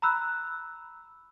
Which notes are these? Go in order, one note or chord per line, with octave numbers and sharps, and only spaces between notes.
A#5 B5 E6 F#6